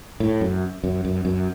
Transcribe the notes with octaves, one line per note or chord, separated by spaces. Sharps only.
A2
F#2
F#2
F#2
F#2